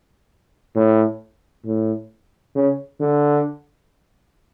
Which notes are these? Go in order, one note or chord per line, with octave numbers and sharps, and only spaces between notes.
A2
A2
C#3
D3